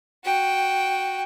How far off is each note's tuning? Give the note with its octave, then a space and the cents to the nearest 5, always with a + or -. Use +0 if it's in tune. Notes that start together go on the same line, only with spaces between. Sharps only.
F#4 +0 G5 +0